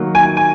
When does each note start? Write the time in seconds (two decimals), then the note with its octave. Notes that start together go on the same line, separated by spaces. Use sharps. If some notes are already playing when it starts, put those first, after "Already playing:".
Already playing: D#3 F#3 A#3
0.15 G#5
0.37 G#5